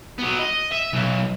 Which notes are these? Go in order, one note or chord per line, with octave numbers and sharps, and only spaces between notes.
F#3 B3
D#5
E5
B1